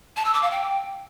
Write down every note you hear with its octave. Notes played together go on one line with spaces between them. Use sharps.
A5
E6
D6
F5
G5